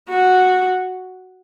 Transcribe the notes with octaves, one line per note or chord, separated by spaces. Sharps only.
F#4